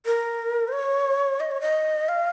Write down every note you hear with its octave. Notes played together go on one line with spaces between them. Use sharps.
A#4
C5
C#5
D#5
C#5
D#5
F5